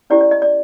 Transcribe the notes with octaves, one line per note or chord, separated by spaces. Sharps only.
C#4 E4 G4 C5 D5
D5
D#5
D5